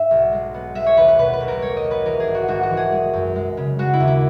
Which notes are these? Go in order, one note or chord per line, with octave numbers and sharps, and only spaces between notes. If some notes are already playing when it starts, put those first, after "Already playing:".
Already playing: G#2 E5
B1
G#3
B3
G#3 E5
C#5
D#2 B4
B4
B2 B4
B4
B1
A#4
G#3 C#5
D#5
B1
B4
E3 A#4
G#4
G#1
F#4
G#1 F#4
F#4
E3
G#4
G#3
F#2
G#3
C#3
G#3 F#4
E4
D#2
E4